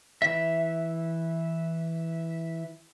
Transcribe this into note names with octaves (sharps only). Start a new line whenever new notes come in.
E3 E5